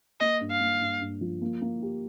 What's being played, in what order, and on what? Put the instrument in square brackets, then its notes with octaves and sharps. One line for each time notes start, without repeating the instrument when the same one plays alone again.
[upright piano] A#3 [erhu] D#5
[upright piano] G2
[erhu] F5
[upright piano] A#3
G2
G2
F3
A#3
A#3
G4